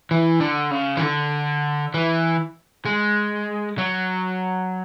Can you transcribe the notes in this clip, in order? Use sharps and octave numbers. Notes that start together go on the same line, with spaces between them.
E3
D3
C#3
E3
D3
E3
G#3
F#3